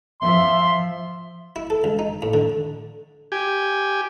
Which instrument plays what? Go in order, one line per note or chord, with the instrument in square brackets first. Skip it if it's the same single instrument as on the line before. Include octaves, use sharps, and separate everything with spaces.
[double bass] F3 [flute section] E5 [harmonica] C6
[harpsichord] E4
A4
C#2
D#4
A2
D3
[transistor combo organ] G4 G#5